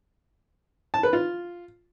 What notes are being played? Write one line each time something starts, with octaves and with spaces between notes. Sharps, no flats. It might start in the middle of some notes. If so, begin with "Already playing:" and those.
A5
B4
F4